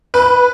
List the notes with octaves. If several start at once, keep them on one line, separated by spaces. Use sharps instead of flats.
B4